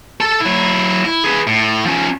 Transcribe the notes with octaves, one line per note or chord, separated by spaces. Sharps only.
A4 A5
F#3 E4
E4
G#4 B4
A2
F3 C#4